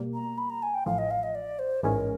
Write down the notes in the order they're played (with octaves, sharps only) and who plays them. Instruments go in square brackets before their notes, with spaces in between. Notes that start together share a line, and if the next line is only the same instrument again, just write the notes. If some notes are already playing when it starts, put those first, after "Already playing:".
Already playing: [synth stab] B2 G3 A#3
[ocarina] A#5
B5
A#5
G#5
G5
[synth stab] A1 A2 F3 [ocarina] F5
[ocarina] D#5
F5
D#5
D5
C5
[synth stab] A1 G#2 E3 G#3 C#4 [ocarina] A#4